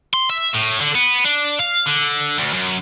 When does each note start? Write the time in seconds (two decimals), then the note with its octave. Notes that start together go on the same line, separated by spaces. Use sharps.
0.14 C6
0.29 E5
0.53 A2
0.80 D3
0.95 B3
1.25 D4
1.59 F5
1.86 D3
2.38 D2
2.53 F#2